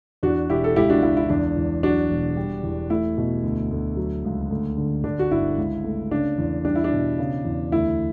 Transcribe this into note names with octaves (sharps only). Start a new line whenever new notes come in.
E2 D4 F#4
E1 E4 G4
A4
C#2 E4 G4
D4 F#4
C#2 E4
E4
E2 D4
E2
F#3 D4 F#4
E1
G3
E2
A3 E4
B2
D2
D2
F#3
C#2
D2
D3
D3 D4
F#4
G1 E4
C#2
A3
C#3 D4
E2
G3 D4
E4
D4
B2
C#3
E2
D2 E4